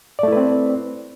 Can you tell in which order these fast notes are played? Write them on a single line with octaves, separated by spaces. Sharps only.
D5 A3 E4 B4 C4